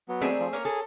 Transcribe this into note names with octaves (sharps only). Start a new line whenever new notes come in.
F#3 B3
D#3 G#3 A3 C4 G#4 D5
F3
A#3 C#4 A#4 C#5 F6
G#4 A4